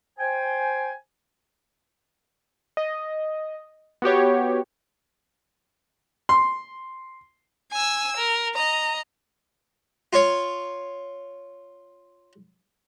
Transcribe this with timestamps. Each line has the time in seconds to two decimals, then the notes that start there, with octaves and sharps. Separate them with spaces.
0.18 C5 G5 G#5
2.77 D#5
4.02 B3 F#4 G4 C#5
6.29 C6
7.72 G#5 E6
8.17 A#4
8.55 D#5 A#5
10.13 F4 C#5